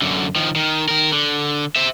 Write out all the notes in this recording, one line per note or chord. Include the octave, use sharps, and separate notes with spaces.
F#2 D3
D#3 F3
D#3
D#3 A#4
D3
C5 E5